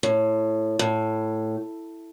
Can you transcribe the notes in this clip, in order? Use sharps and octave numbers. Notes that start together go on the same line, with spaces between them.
A2
A2